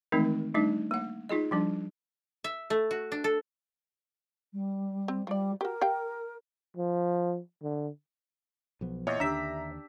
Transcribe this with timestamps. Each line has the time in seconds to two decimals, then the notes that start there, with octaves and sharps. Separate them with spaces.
0.12 D#3 E3 G#3 A3 C4 D#4
0.55 G3 A3 D4 D#4
0.91 A#3 F#5
1.29 D#4 F4 G#4 D#5
1.51 F3 G3 D4
2.44 E5
2.70 A3
2.91 F#4
3.12 D4
3.24 A4
4.53 G3
5.08 C4
5.27 F3 G3 D5
5.61 F#4 G4 A#4
5.81 G4 F5 G5
6.77 F3
7.62 D3
8.81 B1 F3 B3
9.07 E2 A#2 C#5 D#5
9.20 D#2 D3 D4 G4 E5 A#5 E6 B6